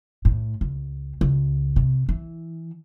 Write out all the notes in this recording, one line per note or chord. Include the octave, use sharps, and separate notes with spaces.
A2
C#2
C#2
C3
E3